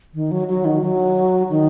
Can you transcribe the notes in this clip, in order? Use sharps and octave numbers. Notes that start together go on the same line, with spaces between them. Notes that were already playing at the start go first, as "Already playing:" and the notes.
D#3
F#3
F#3
D#3
F#3
D#3